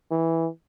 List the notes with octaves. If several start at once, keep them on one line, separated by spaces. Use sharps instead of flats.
E3